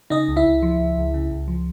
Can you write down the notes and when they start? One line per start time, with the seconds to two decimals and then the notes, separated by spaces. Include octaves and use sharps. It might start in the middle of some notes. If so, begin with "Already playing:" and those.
0.10 C#3 D#4 D#5
0.28 C#2
0.37 E4 E5
0.45 C#2
0.63 F3
0.80 C#2
0.97 C#2
1.14 C#3
1.31 C#2
1.48 F3